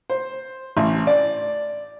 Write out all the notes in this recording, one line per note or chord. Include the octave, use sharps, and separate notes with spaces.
C5
A1
D5